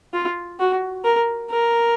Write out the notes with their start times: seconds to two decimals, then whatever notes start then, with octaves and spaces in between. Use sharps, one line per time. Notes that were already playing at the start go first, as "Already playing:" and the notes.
0.13 F4
0.59 F#4
1.04 A#4
1.50 A#4